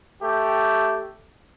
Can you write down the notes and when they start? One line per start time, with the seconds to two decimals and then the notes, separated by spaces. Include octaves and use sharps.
0.22 A3 G4